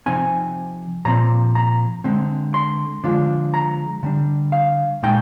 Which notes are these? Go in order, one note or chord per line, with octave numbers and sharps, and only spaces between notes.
C3 F3 C4 D#4 G#5
A#2 F3 C4 A#5
A#5
D3 G#3 C4
C6
D3 F3 G#3 D4 F4
A#5
D3 G3 D4
F5
A#2 G#3 D#4 G5